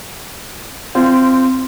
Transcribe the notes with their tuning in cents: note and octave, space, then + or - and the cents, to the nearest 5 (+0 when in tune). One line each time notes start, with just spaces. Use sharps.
C4 -5 F4 -25